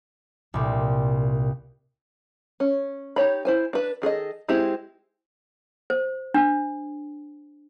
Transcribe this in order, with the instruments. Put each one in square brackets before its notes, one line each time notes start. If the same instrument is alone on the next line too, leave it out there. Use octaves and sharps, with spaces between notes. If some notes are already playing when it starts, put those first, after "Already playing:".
[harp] C2 A#2
[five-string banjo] C#4
D#4 G4 C#5 B5
E4 C5 G#5
D4 B4
D#3 G#4 A4 D#5
G#3 C4 E4 G4 G#4
[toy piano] C5
D4